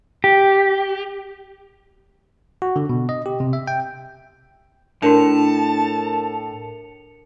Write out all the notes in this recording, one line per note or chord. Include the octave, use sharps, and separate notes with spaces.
G4
F#4
D3
B2
D#5
G4
C3
E5
G5
A2 D4 F#4 A#4 A5 C#7 F7